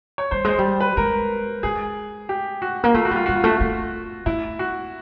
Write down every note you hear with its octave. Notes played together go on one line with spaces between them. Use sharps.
C#5
G3 C5
G#3 C5
G3
B4
G#3 A#4
G#3 G#4
G4
F#4
A#3
A3 F4
F#4
G3 F4
G3 F#4
F4
A3 F#4
A3 F4
A3 E4
F#4